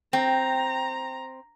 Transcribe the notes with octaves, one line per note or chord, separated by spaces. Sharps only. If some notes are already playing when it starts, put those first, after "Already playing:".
C4 G5 A#5